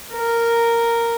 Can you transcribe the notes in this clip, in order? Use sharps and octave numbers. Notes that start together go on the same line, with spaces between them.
A#4